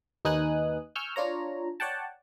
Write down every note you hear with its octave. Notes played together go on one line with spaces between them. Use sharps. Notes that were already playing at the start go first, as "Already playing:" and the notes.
D#2 D#4 B4 G#5 D#6 F#6
G#5 C#6 E6 F6 G6
D4 F4 C#5 A#5
C#5 D5 F#5 G5 A5